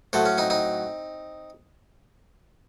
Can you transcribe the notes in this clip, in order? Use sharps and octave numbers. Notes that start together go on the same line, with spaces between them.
A2 F#3 A3 A4 C5
C#4
C4 D#4
C4 D#4